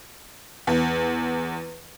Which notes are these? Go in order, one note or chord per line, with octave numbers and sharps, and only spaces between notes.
E2